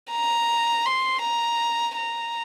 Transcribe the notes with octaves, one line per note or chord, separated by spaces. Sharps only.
A#5
C6
A#5
A#5